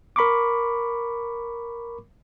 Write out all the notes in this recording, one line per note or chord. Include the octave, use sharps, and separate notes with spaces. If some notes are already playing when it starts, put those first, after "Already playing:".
A#4 B5 C#6 D6